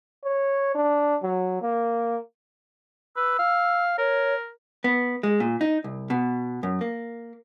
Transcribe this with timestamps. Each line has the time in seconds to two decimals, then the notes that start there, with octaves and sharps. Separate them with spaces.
0.25 C#5
0.75 D4
1.23 F#3
1.61 A#3
3.17 B4 E6
3.39 F5
3.98 A#4 C#5
4.84 B3
5.23 G#3
5.40 A#2
5.61 D#4
5.84 C2
6.10 B2
6.63 F#2
6.81 A#3